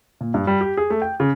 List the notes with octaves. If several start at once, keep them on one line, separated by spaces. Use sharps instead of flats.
A#2
G2
G3
G4
G#4
A3
G5
C#3